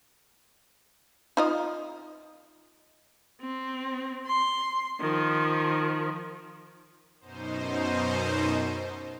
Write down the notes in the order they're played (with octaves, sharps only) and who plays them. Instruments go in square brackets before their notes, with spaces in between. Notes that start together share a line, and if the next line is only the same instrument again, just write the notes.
[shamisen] D#4 F4 D#5
[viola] C4
C6
D#3 F3
[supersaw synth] F#2 B2 D#4 C5